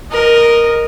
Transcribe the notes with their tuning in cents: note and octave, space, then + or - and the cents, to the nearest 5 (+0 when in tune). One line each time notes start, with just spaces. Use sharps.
A#4 +5 D#5 -10